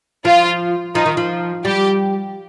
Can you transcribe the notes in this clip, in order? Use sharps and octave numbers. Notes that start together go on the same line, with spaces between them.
F3 F4
F3 D#4
D#3
F3
G3 G4